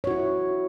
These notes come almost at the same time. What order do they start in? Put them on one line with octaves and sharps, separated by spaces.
C#5 F#4 E4